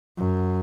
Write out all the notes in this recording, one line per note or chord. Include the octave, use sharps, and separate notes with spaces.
F#2